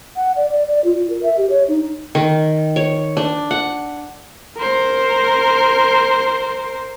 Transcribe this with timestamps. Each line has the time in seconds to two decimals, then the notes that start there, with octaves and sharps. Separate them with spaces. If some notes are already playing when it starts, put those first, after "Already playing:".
0.16 F#5
0.36 D5
0.49 D5
0.69 D5
0.84 F4
0.97 F4
1.10 A#4
1.23 E5
1.37 G4
1.50 C#5
1.68 D#4
2.15 D#3
2.76 C#5
3.17 D4
3.51 F#5
4.57 A#4 C5